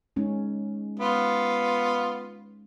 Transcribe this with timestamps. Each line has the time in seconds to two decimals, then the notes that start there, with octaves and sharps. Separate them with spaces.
0.16 G#3 C#4 D#4
0.99 B3 F4